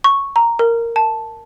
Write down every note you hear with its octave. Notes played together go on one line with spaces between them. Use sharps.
C#6
A#5
A#4
A5